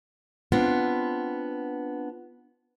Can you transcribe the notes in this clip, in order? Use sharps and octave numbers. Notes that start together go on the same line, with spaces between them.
B3 C4 D4 F4